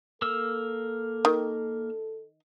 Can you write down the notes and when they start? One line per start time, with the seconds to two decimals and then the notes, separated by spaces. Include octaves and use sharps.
0.22 A#3 A4 A#4 E6
1.25 D#3